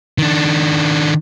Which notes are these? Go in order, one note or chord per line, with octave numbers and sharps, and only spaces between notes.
D#3 D4